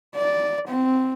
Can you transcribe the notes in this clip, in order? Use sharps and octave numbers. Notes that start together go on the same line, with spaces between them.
D5
C4